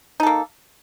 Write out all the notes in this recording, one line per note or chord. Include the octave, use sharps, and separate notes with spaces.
A#3 D#4 A4